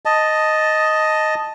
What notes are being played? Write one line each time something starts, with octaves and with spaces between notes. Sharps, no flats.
D#5 A5